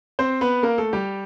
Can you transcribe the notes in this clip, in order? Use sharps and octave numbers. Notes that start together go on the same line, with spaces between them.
C4 C5
B3 B4
A#3 A#4
A3 A4
G3 G4